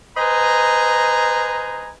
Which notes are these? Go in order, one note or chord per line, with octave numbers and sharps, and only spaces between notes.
B4 C5 D#5 G#5 A#5